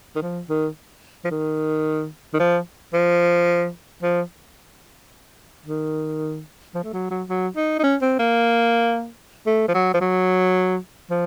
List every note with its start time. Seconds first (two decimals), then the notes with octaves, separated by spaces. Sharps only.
0.16 D#3
0.22 F3
0.49 D#3
1.25 F3
1.31 D#3
2.34 D#3
2.40 F3
2.93 F3
4.02 F3
5.66 D#3
6.75 F3
6.84 A3
6.93 F#3
7.11 F#3
7.29 F#3
7.56 D#4
7.79 D#4
7.84 C#4
8.02 C4
8.19 A#3
9.46 A3
9.68 F3
9.75 F#3
9.94 F3
10.01 F#3
11.10 F3